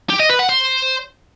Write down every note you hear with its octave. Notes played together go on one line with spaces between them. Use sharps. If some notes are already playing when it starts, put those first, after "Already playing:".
G4
D#5
B4
F#5
C5